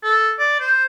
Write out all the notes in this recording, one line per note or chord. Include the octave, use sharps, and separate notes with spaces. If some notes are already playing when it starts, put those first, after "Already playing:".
A4
D5
C5